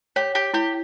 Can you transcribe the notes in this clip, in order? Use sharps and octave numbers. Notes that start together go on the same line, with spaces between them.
G4 C#5
G4
E4 G4